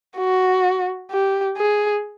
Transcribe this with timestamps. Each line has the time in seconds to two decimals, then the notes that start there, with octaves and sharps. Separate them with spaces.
0.17 F#4
1.11 G4
1.57 G#4